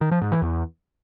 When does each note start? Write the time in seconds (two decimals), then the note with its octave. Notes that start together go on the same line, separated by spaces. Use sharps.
0.01 D#3
0.11 F3
0.22 G#2
0.32 E3
0.42 E2